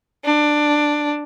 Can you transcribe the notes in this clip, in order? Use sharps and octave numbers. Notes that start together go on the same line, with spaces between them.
D4